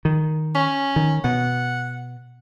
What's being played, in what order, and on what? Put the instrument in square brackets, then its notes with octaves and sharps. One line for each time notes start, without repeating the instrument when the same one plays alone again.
[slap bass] D#3
[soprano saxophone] C#4
[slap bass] D#3
[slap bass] B2 [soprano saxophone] F#5